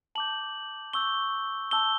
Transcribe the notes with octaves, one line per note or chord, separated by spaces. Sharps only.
A5 D6 G6 F#7
C#6 E6 G6 G7
A5 E6 G6 G7